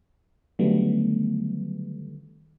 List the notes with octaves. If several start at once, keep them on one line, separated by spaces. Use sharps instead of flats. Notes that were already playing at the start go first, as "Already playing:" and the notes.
D3 D#3 F#3 G3 A3 B3